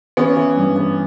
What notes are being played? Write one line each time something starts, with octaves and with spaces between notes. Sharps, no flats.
E3 B3 C#4
E3
G2
E3